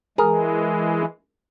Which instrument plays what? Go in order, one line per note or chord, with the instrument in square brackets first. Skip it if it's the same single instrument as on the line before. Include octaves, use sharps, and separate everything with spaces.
[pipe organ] E3 G#3 [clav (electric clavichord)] G#4 A#4